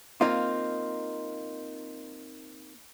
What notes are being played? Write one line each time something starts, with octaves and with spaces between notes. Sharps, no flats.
A#3 C4 D#4 F4